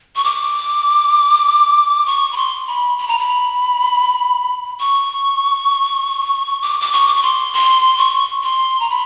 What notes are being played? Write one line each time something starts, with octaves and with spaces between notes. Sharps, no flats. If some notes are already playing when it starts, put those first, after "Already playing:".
C#6
D6
C#6
B5
C6
B5
B5
A#5
B5
C#6
D6
D6
C#6
D6
C#6
C6
C6
C#6
C6
A#5
B5